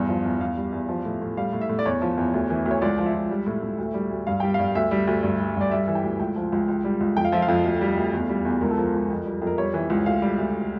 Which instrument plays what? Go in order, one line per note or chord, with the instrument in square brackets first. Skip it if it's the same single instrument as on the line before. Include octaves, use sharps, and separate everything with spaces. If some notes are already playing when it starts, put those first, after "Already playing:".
Already playing: [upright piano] E2 G2
F3
E2
E2 F5
G3
E2
F3
A2
A2
G3 F5
A2
E5
A2
D5
E2 C#5
F3
E2
D2
E3
D2
C#5
C#2 D5
F3
E5
C#2
G3
A2
A2
D2
G3
D2
G2 F5
G3 G5
G2 F5
D2 E5
G3
D2
G2
G3
G2
D5
G3 E5
E3
G5
D2
C#2 G5
F3
C#2
C#2
G3
C#2
F2 G5
F5
F3 E5
F5
F2
D2
G3
D2
E2
G3
E2
C#2 A#4
A4
F3 A#4
C#2
F2
G3
F2
A#4
G3 C#5
E3
C#2
D2 F5
G3
D2